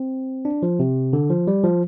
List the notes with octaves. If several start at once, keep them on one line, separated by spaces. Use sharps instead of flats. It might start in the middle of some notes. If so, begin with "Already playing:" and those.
Already playing: C4
D4
F3
C3
D3
F3
G3
F3